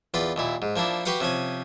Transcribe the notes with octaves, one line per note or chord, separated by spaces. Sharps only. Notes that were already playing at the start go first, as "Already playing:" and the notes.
E2 F4 B4 D5
D#2 A#2 E4
G#2
F3 A#3 D4 E4
F#4 G4 B4 F5 F#5
C3 F3 C#4 G#5